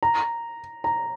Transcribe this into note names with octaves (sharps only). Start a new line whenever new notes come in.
A#5
A#5